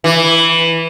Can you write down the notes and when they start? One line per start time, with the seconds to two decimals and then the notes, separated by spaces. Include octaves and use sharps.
0.04 E3